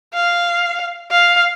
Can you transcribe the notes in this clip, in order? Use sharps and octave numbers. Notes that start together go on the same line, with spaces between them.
F5
F5